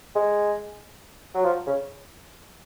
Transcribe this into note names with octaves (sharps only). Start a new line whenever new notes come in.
G#3
F#3
F3
C#3